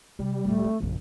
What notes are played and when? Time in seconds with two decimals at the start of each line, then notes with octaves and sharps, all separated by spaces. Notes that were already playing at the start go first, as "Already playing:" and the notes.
0.19 C3 G3
0.45 D2 A#2 A3
0.64 C4
0.80 A#1 F#2 C#3